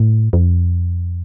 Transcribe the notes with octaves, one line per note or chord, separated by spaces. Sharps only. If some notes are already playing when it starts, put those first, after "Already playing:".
Already playing: A2
F2